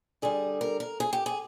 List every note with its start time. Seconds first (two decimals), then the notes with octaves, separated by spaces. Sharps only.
0.22 D3 G3 G#4
0.61 A#4
0.80 A#4
1.00 G#4
1.13 G4
1.26 G#4